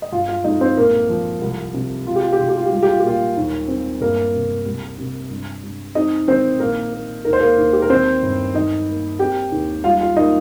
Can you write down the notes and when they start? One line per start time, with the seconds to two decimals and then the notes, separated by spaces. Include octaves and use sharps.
0.02 D#5
0.12 G1 F4 F5
0.29 F4 F5
0.44 F2 D#4 D#5
0.61 C4 C5
0.77 A#1 A#3 A#4
1.10 F3
1.41 C2
1.74 C3
2.07 F1 F4
2.16 G4
2.23 F4
2.33 G4
2.39 F1 F4
2.49 G4
2.57 F4
2.66 G4
2.72 G3 F4
2.83 G4
2.91 F4
2.99 G4
3.03 A#2 F4
3.37 D#2
3.68 C4
4.01 G1 A#3 A#4
4.33 C3
4.66 C2
4.98 C3
5.31 G2
5.64 G2
5.95 C4 D#4 D#5
6.28 D#3 C4 C5
6.60 A#1 A#3 A#4
6.93 A#3
7.25 D#2 A#4
7.33 C5
7.40 A#3 A#4
7.58 D#2
7.73 G4
7.82 A#4
7.90 D#3 C4 C5
8.22 G1
8.54 D#3 D#4 D#5
8.88 A#3
9.19 C4 G4 G5
9.52 D#2
9.84 G3 F4 F5
10.01 F4 F5
10.17 A#3 D#4 D#5